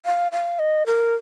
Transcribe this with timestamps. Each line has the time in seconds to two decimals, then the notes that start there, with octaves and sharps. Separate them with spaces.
0.06 F5
0.32 F5
0.59 D#5
0.86 A#4